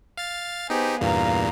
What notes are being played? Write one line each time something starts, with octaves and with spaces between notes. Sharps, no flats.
F5 A6
B3 D#4 G4 G#4 C5
E2 G2 A#2 F5 A#5